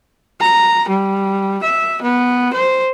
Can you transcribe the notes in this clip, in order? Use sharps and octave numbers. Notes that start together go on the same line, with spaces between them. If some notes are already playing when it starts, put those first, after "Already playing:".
A#5
G3
E5
B3
C5